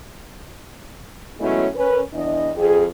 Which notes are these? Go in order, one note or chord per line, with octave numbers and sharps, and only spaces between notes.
F#3 G#3 A3 B3 C#4 E4
C#4 A#4 B4
E2 D4 D#5
F2 G#4